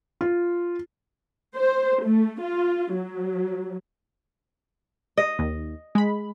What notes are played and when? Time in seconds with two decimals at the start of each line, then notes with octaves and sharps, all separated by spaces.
0.21 F4
1.55 C5
2.05 A3
2.41 F4
2.94 F#3
5.17 D#5
5.39 D#2
5.95 G#3 B5